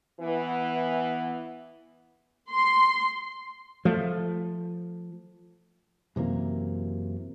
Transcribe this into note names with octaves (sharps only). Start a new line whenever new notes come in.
E3 B3
C6
F3 A3
F#2 C3 E3 A#3